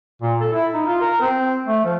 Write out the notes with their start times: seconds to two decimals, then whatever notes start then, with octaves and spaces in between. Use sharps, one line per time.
0.22 A#2
0.41 A4
0.53 E4
0.73 D#4
0.86 F4
1.01 A#4
1.21 C4
1.67 A3
1.85 F3